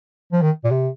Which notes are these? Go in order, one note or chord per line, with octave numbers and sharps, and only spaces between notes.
F3
D#3
A#2
C3